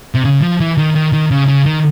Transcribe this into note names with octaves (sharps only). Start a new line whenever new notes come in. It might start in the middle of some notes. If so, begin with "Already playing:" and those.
C3
C#3
F3
E3
D#3
D#3
D#3
C#3
C#3
D#3